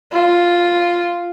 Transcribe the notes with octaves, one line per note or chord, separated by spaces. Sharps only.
F4